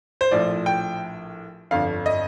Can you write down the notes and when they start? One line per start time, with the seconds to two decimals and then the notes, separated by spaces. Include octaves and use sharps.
0.21 C5
0.31 A#1 A2 F3 D5
0.66 G5
1.71 G1 F2 D3 F5
2.06 D#5